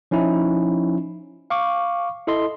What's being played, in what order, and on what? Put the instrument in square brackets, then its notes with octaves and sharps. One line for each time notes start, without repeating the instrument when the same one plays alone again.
[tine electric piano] F3 C#4 D#4 E4
F5 C#6 D6
E4 A4 D#5 C6